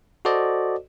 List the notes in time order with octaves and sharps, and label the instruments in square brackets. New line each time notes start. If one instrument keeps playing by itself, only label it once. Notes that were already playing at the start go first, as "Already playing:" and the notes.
[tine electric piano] F#4 A4 C5 D5 D#5